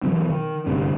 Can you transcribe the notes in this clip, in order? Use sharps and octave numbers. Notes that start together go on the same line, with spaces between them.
B2 E3 F#3 C4
D#3
G1 D2 C3 C#4